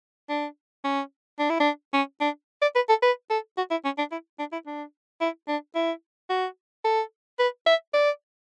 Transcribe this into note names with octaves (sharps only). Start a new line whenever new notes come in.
D4
C#4
D4
E4
D4
C#4
D4
D5
B4
A4
B4
A4
F#4
E4
C#4
D4
E4
D4
E4
D4
E4
D4
E4
F#4
A4
B4
E5
D5